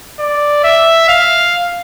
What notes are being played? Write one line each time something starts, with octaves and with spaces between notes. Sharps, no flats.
D5
E5
F5